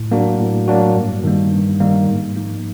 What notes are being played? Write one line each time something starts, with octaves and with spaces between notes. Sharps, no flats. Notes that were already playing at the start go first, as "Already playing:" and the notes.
Already playing: A2
F#3 A#3 D4 F#4
A2
F#3 A#3 D4 F#4
G2
D#3 G3 A#3
G2
D#3 G3 A#3
G#2
F3 A#3 D#4